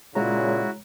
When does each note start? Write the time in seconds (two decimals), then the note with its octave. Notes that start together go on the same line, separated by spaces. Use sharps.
0.15 A#2 C#3 G#3 E4 F#4 C#5 A#5